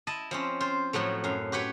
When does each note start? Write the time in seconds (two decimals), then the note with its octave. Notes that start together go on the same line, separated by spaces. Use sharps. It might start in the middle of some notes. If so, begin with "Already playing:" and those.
0.07 E4 D#5 A5
0.31 F3 C4 C#4
0.60 F4 C5
0.93 A2 F3 F#3 A3
1.24 F#2 F5
1.52 F#4 G4 B4 C#5